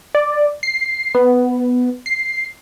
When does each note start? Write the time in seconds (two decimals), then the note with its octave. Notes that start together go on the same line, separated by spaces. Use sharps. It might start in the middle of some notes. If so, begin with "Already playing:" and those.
0.15 D5
0.63 C7
1.15 B3
2.06 C7